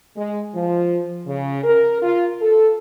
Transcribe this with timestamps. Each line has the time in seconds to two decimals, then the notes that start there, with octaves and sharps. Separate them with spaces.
0.17 G#3
0.55 F3
1.27 C#3
1.63 A#4
2.02 F4
2.41 A4